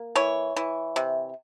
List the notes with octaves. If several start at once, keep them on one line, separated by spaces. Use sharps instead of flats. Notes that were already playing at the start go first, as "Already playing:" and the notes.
Already playing: A#3
E3 C#5
E3
C3